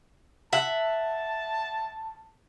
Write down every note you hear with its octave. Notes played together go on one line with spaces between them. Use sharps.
E5 F#5 A5